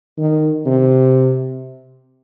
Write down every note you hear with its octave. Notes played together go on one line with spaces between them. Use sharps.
D#3
C3